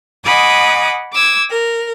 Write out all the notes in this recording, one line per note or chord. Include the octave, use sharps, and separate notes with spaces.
D#5 F#5 G#5 B5 D6 D#6
D6 E6 G#6
A#4